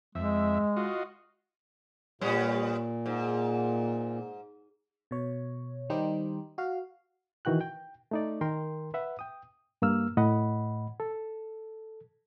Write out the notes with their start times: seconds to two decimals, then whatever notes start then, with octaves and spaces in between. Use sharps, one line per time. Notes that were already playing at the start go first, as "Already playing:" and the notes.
0.15 F2 G#3 E5
0.77 F4 F#4 D#5
2.21 A#2 G3 B3 C#4
3.06 G#2
5.11 B2 C#5
5.90 D#3 G3 D#4 G4 C5
6.58 F#4 F5
7.45 D#3 E3 F#4 G5 F#6
7.61 G5
8.11 A3 D#4 D5
8.41 D#3 A#4 G5 C6
8.94 B4 E5 F#5
9.19 G5 D#6
9.82 G2 A#3 E6 F6
10.17 A2 D#5 F#5 B5
11.00 A4